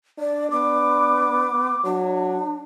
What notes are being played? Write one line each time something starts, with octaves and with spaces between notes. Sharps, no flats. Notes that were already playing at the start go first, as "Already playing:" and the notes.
D4 D5
B3 D6
F#3 D4